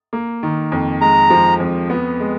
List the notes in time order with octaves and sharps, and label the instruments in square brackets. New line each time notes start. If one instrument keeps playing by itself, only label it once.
[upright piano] A#3
D#3
F2
[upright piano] G#3 [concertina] A#5
[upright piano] F3
F2
B3
G#3